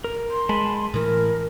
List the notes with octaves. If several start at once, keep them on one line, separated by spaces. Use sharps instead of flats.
A#4
C6
G#3 G#5 A5 B5
A2 E3 A#4